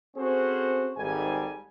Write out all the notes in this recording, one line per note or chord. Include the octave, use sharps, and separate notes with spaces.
C4 C#4 F#4 G#4 A4 C5
G#1 G#2 G3 G4 A4 G#5